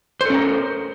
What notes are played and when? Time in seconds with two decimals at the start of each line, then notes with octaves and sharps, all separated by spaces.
0.21 C5
0.25 A4
0.30 C#4
0.35 A#4